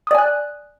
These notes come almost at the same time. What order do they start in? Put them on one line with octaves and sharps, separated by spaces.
D#6 D5 G#5 F#6